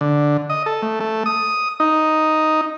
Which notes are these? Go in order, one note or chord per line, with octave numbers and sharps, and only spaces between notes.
D3
D#5
A4
A3
A3
D#6
D#4